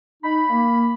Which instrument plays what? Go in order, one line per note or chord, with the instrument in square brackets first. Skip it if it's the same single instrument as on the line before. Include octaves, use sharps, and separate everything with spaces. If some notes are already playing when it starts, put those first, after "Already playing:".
[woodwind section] D#4 [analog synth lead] B5
[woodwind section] A#3